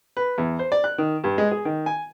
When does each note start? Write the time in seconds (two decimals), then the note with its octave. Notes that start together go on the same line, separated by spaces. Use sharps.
0.17 B4
0.38 E2
0.59 C5
0.72 D5
0.84 F#6
0.98 D#3
1.24 G2
1.38 G#3
1.51 G#4
1.65 D#3
1.86 G#5